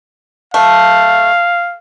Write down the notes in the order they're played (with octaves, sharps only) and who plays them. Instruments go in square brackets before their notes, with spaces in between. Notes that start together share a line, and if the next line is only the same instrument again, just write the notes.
[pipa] A3 [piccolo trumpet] F5